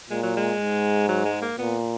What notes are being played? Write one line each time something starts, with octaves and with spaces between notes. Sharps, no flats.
A#2 G#3
F#3
G#3
G#2
F#3
G#3
A#3
A#2 B3